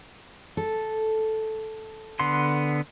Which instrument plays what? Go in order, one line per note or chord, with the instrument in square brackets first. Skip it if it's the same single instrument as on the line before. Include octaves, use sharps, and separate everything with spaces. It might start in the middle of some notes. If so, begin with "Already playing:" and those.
[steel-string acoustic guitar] A4
[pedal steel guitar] D3 B3 C6